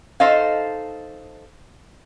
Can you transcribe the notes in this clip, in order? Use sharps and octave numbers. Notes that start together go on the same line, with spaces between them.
D#4 A4 C5 D#5 F5